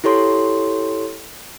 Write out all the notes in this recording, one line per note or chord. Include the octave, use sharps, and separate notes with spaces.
E4 G4 A4 C#5 C6